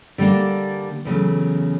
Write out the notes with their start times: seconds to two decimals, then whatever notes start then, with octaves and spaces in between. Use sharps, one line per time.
0.18 D3 G3 A#3 D4
1.05 E2 C#3 F#3 A3